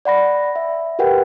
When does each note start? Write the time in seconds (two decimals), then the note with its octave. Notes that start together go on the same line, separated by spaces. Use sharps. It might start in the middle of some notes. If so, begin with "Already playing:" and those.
0.05 D5 F#5 B5 A#6
0.56 E5
0.99 F#4 G4 A#4 B4 F#5 G5